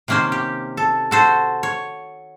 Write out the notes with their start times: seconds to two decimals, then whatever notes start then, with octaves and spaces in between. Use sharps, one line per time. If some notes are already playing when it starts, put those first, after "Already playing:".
0.08 C3 D#3 A#3 C#4 C5
0.32 G4
0.77 A4
1.11 F#4 A4 C5
1.63 C#5